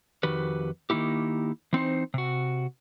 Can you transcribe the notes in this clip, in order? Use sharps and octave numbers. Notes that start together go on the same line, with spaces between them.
F2 D#3 F#4 G4 B4
D#3 A#3 D#4 E4 G4
E3 C4 D#4 C5
C3 F#4